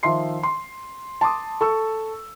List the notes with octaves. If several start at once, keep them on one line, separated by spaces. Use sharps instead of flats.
D#3 F3 E5 C6 C7
C6
A5 C6 D6 D#6
A4 C#6 E6